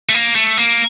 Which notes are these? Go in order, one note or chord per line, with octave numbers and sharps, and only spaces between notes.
A3
A#3
A3
A#3